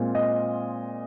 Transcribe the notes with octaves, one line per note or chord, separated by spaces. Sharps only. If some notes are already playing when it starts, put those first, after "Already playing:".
Already playing: A#2 G#3 C4 F4
D#5